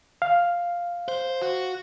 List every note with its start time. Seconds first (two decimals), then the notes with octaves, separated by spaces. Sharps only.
0.22 F5
1.08 C5
1.42 F#4